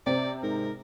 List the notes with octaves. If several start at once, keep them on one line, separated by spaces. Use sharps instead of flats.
C3 C4 D5
G#2 A#4